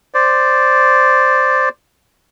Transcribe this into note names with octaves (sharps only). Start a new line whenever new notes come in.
C5 D5